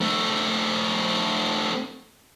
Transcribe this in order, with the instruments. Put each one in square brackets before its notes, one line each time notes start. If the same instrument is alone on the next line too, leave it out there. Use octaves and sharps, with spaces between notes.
[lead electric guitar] A3 C4